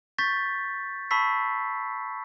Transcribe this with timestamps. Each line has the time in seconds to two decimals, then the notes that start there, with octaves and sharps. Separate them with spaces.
0.18 C#6 G6 A6 B6
1.11 A5 B5 C#6 E6 B6 C7